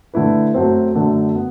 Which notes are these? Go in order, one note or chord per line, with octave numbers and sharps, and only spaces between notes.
D3 A3 E4 B4
F#2 F#3 A3 C4
F#2 D3 A3
B3